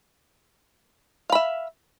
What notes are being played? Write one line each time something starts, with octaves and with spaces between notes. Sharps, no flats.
E5 F5 B5